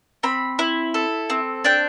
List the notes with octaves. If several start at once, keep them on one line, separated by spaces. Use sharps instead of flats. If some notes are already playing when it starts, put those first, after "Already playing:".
C4 B5
E4
A4
C4
D4 G5